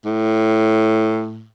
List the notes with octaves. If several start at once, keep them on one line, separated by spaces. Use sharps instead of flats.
A2